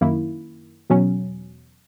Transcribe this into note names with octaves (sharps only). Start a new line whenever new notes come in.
F#2 D#3 A#3 E4
E2 B2 F#3 C#4